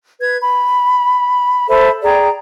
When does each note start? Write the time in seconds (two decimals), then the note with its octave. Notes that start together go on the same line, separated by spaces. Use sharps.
0.21 B4 G#6
0.41 B5
1.69 A4 C5 E5 B5
2.03 G#4 D5 G5 A#5